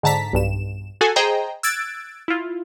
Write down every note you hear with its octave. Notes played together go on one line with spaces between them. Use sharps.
G#2 D3 A5 A#5 B6
B1 G2 E7
F#4 G#4 A4 F#5 G#5
G#4 C5 D#5 G5 A#5
E6 F#6 G#6 A6 D7
E4 F4